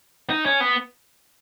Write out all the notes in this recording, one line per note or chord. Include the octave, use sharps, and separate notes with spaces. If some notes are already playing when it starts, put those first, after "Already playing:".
D#4
C#4
B3